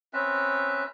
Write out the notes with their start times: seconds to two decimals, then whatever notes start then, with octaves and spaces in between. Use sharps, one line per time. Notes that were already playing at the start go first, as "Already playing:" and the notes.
0.13 C4 C#4 B4 E5